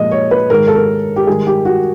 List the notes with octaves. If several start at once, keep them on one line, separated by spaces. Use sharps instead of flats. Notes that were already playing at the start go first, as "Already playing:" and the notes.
Already playing: A#2 F3 G#3 D#5
C#5
B4
G#2 D#3 G#3 A#4
A4
A#4
G4
G#2 D#3 G3 G#4
G4
F#4